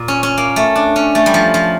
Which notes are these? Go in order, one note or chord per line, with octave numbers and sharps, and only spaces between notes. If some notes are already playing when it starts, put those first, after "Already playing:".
Already playing: A#2
C#4
C#4
A#3
A3
D4
C#4
A3
G3
F3
F3